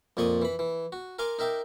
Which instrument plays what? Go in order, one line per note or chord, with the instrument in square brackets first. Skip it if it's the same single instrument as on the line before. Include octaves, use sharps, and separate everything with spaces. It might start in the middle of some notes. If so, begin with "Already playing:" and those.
[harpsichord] F2 A#2 D5 C6 C#6 D#6
E3 B5
E3
F#4
A#4 F5 G#5 C6 D6
D#4 A#4 E5 G5 D6